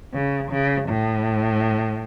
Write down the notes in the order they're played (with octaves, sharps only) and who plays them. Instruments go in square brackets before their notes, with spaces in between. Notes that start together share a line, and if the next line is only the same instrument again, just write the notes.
[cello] C#3
C#3
A2